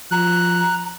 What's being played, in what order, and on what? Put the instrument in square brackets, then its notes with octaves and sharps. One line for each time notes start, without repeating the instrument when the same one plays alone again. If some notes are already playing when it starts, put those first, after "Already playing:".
[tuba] F3 [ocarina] A#5 [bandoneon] F#6